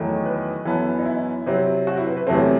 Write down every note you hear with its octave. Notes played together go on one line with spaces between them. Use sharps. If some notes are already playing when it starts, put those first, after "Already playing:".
Already playing: E2 D#3 F#3 A3
B4
F#2 E3 B3 A4
D#4
E4
C3 F#3 C4
F#4
E4
B4
B4
E2 C3 F#3 A3 C4 A4